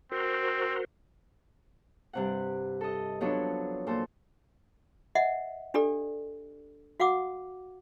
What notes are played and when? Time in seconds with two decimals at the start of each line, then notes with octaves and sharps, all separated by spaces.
0.12 C4 F#4 A#4 C5
2.13 G2 C3 F#5
2.81 A4 D#5
3.20 F3 F#3 B3 D4 A4 C#5
3.87 A#2 A4 C5
5.15 D#5 E5 F#5
5.74 D4 G4 A4 D5
7.00 F#4 F5 F#5 D6 D#6